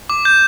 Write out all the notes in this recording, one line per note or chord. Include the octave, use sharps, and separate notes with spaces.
D6
G6